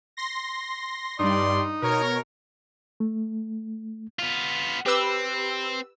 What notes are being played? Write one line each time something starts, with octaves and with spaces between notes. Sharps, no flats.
C6 A#6
G2 G3 D#4 D5 C6
B2 A#4 C#5
A3
B3 F4
C4 G4 B4 E6